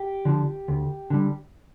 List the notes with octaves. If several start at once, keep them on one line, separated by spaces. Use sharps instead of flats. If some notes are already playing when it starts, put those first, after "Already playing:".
Already playing: G4
D3 F3
D2
D3 G3